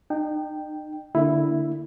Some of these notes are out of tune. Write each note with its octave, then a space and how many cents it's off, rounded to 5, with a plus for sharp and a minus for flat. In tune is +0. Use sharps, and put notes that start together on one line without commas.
D#4 -40 G5 +0
D3 +0 A#3 -25 E4 +0